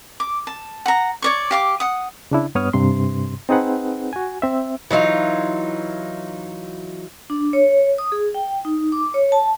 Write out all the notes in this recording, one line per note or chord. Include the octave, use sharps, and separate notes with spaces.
D6
A5
F#5 A#5
C#5 D5 C#6
G4 F5 D6
F#5 D#6
C#3 D4 E4
G2 B3 C#5 D#6 F6
G2 C3 C6
C4 D#4 G#4 B4 F#5
F#4 G#5
C4 E5
E3 F#3 D#4 F4
D4
C#5
D#6
G#4
G5
D#4
D6
C#5
A5